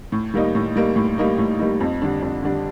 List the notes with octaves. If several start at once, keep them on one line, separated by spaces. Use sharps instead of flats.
A2
G3 A#3 D#4
A2
G3 A#3 D#4
A2
G3 A#3 D#4
A2
G3 A#3 D#4
F2
D3 G3 D4
F2
D3 G3 D4